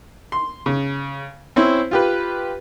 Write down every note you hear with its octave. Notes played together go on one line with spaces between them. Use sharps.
C6
C#3
C4 C#4 E4 C5
F4 G4 B4